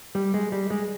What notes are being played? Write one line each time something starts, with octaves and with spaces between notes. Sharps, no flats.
G3
G#3
G3
G#3